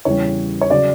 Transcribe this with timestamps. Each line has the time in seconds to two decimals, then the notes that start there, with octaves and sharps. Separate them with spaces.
0.05 E2 C#3 E3 G3 C#5
0.61 C#5
0.70 C#3 F#3 D5